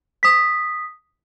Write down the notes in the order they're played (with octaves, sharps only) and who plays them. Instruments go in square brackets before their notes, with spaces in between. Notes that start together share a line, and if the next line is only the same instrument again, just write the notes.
[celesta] D#6 B6